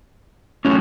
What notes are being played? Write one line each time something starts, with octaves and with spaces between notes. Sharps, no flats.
A2 F#3 C#4